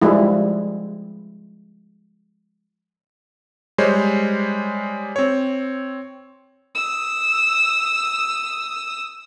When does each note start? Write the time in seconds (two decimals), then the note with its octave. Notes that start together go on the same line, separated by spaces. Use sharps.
0.02 F3 G3 G#3 E4
3.78 G3 G#3 C5 C#5
5.16 C4 C#5
6.75 D#6 E6